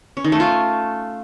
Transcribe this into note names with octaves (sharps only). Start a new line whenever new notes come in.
C#4
D#3
A3
F4